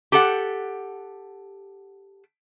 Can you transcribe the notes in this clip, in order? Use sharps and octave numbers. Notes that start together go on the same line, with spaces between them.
G4 A4 F#5